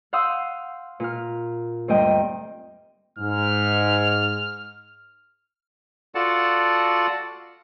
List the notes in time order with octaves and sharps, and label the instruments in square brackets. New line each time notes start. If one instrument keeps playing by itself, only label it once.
[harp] F5 F#5 C6 D#6 E6 G6
A#2 F6
D2 G2 A#3 C4 D#5 G5
[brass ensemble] G#2 [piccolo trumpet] F6
[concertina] F4 F#4 A4 D5 F#5 A5